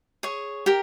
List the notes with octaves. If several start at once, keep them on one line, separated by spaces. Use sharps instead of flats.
G#4 C#5
G4 A#4